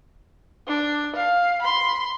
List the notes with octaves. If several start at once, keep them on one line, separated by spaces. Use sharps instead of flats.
D4
F5
B5 C6